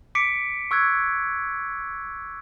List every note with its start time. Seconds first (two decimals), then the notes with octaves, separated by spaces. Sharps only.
0.15 D6 B6 C#7 D7
0.71 C#6 E6 F#6 G#6